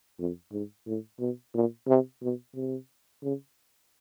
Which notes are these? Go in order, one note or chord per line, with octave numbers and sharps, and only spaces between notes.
F2
G#2
A2
B2
A#2
C3
B2
C3
C#3